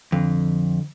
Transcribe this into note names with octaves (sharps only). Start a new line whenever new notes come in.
F2 D3